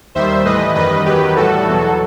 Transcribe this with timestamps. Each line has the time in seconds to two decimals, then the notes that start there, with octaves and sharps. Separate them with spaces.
0.15 D#2 D#3 G3 C5 E5
0.45 A2 E3 G3 B4 D#5
0.75 F#2 D#3 G3 B4 D#5
1.06 E2 D#3 F#3 G4 B4
1.36 A2 G3 F#4 A4
1.67 E2 B2 F#3